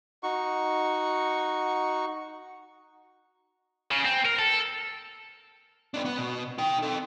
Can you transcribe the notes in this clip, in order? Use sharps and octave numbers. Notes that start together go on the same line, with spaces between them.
D#4 F#4 C#6
C#3
C4
A#4
A4
B3 D4
B3
B2
D#4 G5
C4 A4